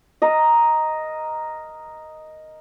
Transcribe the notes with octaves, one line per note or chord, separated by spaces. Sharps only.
A#4 D#5